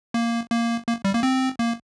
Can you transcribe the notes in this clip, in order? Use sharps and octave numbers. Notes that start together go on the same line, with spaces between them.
A#3
A#3
A#3
G3
A#3
C4
A#3